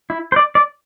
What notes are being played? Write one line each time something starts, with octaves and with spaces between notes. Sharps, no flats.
E4
C5
D5
D5